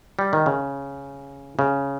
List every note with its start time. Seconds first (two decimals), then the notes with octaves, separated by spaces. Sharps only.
0.19 G3
0.33 D#3
0.46 C#3
1.59 C#3